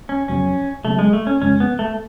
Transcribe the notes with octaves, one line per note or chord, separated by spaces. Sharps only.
C#4
F2 C#3 F#3 B3 C#4
C#3 F#3 A3 B3
G#3
A3
C#4
F2 C#3 G#3 C#4
B3
A3